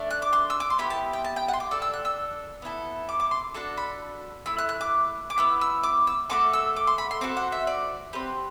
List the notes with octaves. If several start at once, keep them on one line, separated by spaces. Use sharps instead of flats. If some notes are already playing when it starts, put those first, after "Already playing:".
Already playing: A3 D4
F#6
D6
C6
E6
D6
C6
B3 E4 G4 B5
A5
G5
A5
G5
F#5
C6
D6
D4 A4 E6
E6
F#6
E6
B3 E4 A4
D6
D6
C6
D4 F#4 A4 A5
B5
A3 E4 E6
F#6
F#6
D6
D6
B3 E4 E6
E6
D6
E6
A3 C4 F#4 A4 D6
E6
D6
C6
B5
C6
C4 F#4 A4 D6
F#5
E5
D5
C4 G4 B4